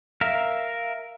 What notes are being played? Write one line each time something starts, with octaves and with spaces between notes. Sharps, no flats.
A#4 E5 F5